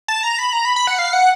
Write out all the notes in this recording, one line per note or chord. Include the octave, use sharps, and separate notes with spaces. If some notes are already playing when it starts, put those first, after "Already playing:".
A5
A#5
B5
A#5
B5
B5
F#5
F5
F#5